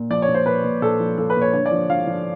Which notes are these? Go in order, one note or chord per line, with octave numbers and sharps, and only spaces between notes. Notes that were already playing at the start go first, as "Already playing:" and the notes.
Already playing: A#2
F3 D5
C#5
A#2
C5
A#2 B4
A#2
A#2 A4
F3
F3 A4
B4
A#2
C#5
D3 C#5
D5
F3
F3 F5
F3